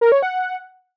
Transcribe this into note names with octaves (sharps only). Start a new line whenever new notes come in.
A#4
C#5
F#5